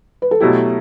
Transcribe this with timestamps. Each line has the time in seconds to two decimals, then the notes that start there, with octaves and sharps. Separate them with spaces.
0.22 B4
0.31 A4
0.40 B2 F#3 A3 E4 G4